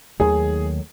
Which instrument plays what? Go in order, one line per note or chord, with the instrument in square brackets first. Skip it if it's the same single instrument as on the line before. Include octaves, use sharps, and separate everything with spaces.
[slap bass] D#2 D#3 F#3 A3 [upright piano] G#4